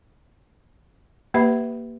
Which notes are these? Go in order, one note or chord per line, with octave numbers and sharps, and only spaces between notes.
A#3 G4 B4 E5 B5